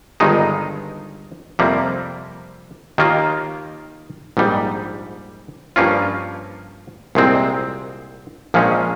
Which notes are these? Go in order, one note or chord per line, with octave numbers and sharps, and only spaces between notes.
G1 G2 D#3 G#3 D#4
F2 C3 G3 A#3
D#2 D#3 A#3 F4
A#1 G#2 G3
G2 F3 A#3 C#4 F4
C2 A#2 G#3 C4
A#1 A#2 F3 G#3 C#4